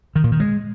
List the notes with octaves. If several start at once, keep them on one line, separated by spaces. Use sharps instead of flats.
D#3
A#2
D#3
G#3